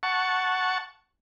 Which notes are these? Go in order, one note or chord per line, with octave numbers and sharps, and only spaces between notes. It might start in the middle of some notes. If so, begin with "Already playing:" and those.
F#5 A5 C#6